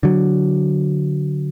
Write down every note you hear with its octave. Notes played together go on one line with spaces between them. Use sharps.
D3 F#3